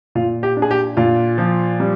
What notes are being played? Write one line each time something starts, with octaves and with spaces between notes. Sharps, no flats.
A#2 F4
G4
D4
G#4
G4
A#2 F4
F3
G3